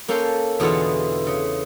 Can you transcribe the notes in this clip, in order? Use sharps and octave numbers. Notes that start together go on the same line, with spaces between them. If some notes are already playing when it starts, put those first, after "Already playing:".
A#3 C#4 A4 F5 G5 C6
E2 B2 D3 B3 F4 G#4
C#3